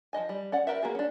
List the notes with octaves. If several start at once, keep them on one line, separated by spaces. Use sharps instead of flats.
F3 F#3 D#5 G#5
G3
C#4 D5 F#5
G4 A#4 B4 E5
A#3 B3 F#4 G#4
C#4 D4